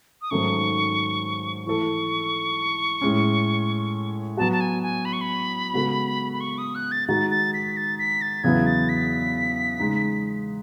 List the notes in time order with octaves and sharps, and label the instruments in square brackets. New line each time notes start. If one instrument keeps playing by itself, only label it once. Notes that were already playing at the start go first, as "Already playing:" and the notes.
[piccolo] D#6
[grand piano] G#2 D#3 F#3 A3 C#4 [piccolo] C#6
[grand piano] E3 A3 E4 A4 [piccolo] C#6
[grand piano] A2 G#3 C#4
[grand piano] F#3 B3 F#4 [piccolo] A5
[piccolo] A5
G#5
G#5
B5
C#6
B5
[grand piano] C#3 G#3 B3 F#4 A4
[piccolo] B5
C#6
D#6
F#6
A6
[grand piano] D#3 G#3 D#4 F#4 [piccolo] A6
[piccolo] A6
B6
A6
B6
A6
[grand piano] E2 C#3 F#3 B3 E4 [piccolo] G#6
[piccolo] A6
B6
[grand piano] C#3 G#3 D#4